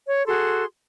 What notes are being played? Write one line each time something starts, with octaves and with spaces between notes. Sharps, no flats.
C#5
F#4 G#4 A4 C6